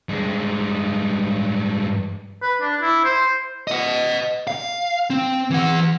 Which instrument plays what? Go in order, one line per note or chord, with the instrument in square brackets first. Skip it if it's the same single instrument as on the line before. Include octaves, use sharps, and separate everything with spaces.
[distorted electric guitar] G2 G#3
[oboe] B4
D4
E4
C5
[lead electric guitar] D#5 F#5
F5
C4
E3 F#5